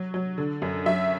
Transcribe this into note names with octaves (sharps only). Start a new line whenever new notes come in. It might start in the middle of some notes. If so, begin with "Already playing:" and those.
Already playing: F#3
F#3
D3
F#2
F#3 E5